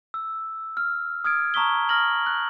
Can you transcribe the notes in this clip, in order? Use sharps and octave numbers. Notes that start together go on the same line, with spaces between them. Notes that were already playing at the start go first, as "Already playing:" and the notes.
E6
F6
D#6 F6 G#6 D7
A5 A#5 C#6 D#6 B6 G7
D#6 F6 A#6 F#7
F#6